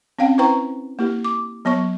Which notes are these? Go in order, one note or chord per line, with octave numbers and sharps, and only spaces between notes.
C4 C#4 F5 G5
E4 B4 C5 G5 A#5 C#6
A#3 E4 G4
D6
F#3 B3 C#5 C#6